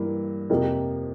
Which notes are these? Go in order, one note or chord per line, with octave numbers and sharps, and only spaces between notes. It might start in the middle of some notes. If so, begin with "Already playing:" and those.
Already playing: G2 E3 A#3 E4
F2 C3 F3 A#3